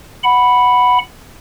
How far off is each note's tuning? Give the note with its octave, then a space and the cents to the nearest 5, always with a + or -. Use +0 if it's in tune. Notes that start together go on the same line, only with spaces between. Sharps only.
F#5 +0 B5 +0